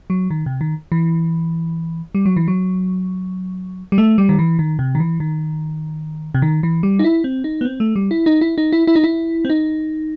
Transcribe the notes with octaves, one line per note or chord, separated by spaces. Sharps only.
F#3
D#3
C3
D#3
E3
G3
F#3
E3
F#3
G3
A3
G3
D#3
E3
D#3
C3
D#3
E3
D#3
C3
D#3
E3
G3
D#4
E4
C4
D#4
B3
C4
A3
G3
E4
D#4
E4
D#4
E4
E4
D#4
E4
C4
D#4